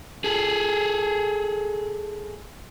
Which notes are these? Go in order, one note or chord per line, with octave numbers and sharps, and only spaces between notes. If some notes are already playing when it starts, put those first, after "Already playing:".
G#4 A4